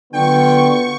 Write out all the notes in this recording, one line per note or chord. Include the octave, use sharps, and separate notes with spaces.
D3 F#3 B3 F4 G5 C#6